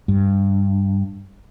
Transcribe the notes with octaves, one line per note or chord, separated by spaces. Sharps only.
G2